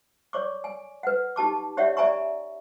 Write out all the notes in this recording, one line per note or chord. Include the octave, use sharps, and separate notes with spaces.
C#5 D5 C#6 D6
G#5
B4 F#5
D#4 G4 A5 D6
C#4 G4 C#5 D5 E5 F#5
D5 E5 G#5 A#5 C#6